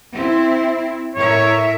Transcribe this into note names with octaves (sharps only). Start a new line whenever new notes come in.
C4 E4
A2 A#4 C#5 E5